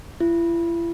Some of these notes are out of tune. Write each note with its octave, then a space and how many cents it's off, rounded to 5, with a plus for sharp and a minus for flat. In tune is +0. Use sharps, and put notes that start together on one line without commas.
E4 +40